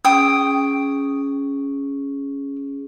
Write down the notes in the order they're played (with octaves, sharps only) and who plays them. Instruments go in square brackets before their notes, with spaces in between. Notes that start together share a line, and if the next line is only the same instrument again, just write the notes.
[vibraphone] C#4 G#4 [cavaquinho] G5 D#6